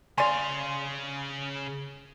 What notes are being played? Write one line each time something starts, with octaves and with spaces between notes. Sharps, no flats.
C#3 D5 F5 G#5 C6